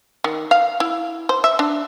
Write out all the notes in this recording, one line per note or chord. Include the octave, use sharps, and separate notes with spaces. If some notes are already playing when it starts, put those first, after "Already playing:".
D#3
F5
E4
C5
E5
D4